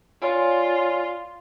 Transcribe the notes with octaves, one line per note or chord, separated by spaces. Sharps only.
F4 C#5 D5 G#5